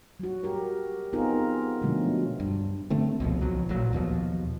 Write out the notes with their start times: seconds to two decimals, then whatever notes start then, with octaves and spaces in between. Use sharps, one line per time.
0.20 F#3 F#4
0.43 G4 A#4
1.13 B3 C4 D#4 F4 G#4 A#4
1.82 B2 D3 F3 F#3 G#3 A3
2.40 G2
2.90 D3 A3 C4
3.20 C#2 B2 F3
3.41 B1 F3 F#3
3.69 A1 A#2 F#3
3.93 D#2 B2 F3